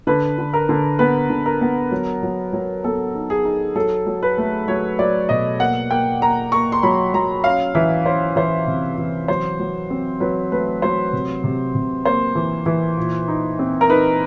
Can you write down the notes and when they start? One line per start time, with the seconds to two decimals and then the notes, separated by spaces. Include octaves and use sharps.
0.07 D3 B4
0.38 D3
0.53 A#4
0.69 D3
0.99 B3 B4
1.30 D3
1.46 A#4
1.61 B3
1.92 F#3
2.23 F#3
2.53 F#3
2.84 B3 A4
3.15 D#4
3.30 G#4
3.45 D#4
3.75 F#3 A4
4.07 F#3
4.23 B4
4.38 A3
4.68 F#3 C#5
4.99 F#3 D5
5.29 B2 D#5
5.60 A#3 F#5
5.91 A#3 G5
6.21 A#3 A#5
6.52 A#3 C#6
6.72 C6
6.83 F#3 B5
7.14 F#3 A#5
7.44 C#4 F5
7.75 E3 E5
8.06 C#4 C5
8.36 E3 C5
8.67 C3
8.98 E3
9.28 F#3 C5
9.60 F#3
9.90 C4
10.20 F#3 B4
10.52 A3 B4
10.82 F#3 C5
11.13 C3
11.44 C3
11.75 C3
12.05 A#3 C5
12.35 E3
12.66 E3
12.97 A#2
13.28 D#4
13.59 C4
13.81 A#4
13.90 D#4 B4